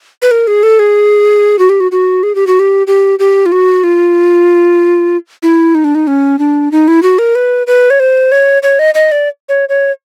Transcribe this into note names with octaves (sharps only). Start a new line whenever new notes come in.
B4
A#4
G#4
A4
G#4
F#4
G4
F#4
F#4
G#4
G4
F#4
G4
G4
G4
F4
F#4
F4
E4
D#4
D4
D#4
C#4
D4
D#4
E4
F#4
A#4
B4
B4
C#5
C5
C#5
C#5
D#5
D#5
D5
C#5
C#5